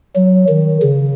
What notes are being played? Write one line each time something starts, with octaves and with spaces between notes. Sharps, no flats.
F#3
D#3
C#3